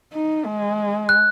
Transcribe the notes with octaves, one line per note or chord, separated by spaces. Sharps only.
D#4
G#3
F#6